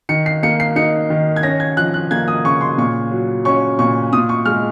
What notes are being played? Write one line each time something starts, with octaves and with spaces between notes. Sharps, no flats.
D#3 C#7
C7
A#3 C#7
C7
D#4 C#7
D#3
G#6
C#4 A#6
G#6
F3 F#6
F#6
A#3 G#6
D#6
C#3 C#6
C6
A#2 C#6
F#3
C#4 C#6
A#2 C#6
A#2 D#6
C#6
G#3 F6